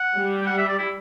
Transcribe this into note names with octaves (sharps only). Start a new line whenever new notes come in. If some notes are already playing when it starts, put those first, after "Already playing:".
Already playing: F#5
G3
G5
F#5
E5
D5
E4